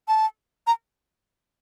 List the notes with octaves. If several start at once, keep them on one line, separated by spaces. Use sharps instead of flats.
A5
A#5